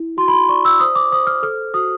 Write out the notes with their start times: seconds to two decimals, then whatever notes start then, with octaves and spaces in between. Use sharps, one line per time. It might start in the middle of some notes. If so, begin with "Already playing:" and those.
Already playing: E4
0.17 F#4 C6
0.28 B5
0.33 C6
0.49 D5 C#6
0.65 E6
0.80 C5 D#6
0.95 D6
1.12 C5 D#6
1.27 F6
1.43 A4 F6
1.74 F#4 D#6